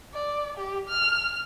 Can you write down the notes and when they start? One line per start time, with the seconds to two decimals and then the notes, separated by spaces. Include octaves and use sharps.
0.13 D5
0.57 G4
0.89 F6